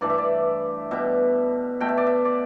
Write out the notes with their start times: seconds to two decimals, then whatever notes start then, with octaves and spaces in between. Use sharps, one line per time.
0.01 G2 E3 A3 D5
0.10 E5
0.18 D5
0.91 B2 G3 E5
1.80 B2 A3 G5
1.89 E5
1.98 D5
2.07 E5
2.25 D5